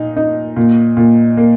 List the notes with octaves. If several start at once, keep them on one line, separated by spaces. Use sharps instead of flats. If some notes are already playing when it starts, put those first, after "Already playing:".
Already playing: A#2 D#4
D#4
A#2
A#2
A#3